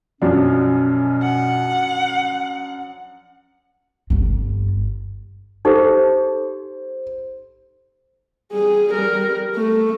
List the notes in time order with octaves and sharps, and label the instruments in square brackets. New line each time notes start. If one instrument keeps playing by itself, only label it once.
[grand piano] F#2 F3 D4 [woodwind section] B2 C#4
[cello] F#5
[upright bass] G1 G2
[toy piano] D#4 G4 A4 [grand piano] C5
[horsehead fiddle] G3 G#4
G3 A#4
A3